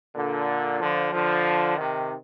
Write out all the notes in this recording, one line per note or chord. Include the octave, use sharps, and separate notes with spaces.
A#2 D3
D3 F3
D3 F3
C3 D#3